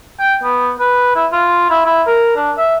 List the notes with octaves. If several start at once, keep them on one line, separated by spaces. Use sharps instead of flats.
G5
B3
B4
E4
F4
E4
E4
A#4
D4
E5